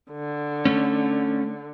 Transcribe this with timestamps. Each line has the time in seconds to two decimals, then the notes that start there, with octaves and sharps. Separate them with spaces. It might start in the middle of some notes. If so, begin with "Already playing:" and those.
0.12 D3
0.65 A3 C#4